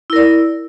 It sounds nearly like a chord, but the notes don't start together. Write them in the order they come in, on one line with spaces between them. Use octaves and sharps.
E4 A#4 D5